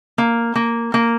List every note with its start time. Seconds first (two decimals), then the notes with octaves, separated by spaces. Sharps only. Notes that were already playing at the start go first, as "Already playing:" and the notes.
0.18 A#3
0.55 A#3
0.94 A#3